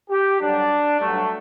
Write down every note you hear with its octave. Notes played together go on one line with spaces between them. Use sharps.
G4
G2 D3 F#3 D4
G2 F#3 A3